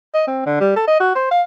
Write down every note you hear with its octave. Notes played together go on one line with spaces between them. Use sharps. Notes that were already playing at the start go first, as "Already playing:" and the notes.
D#5
C4
D3
G3
A4
D#5
F#4
C5
F5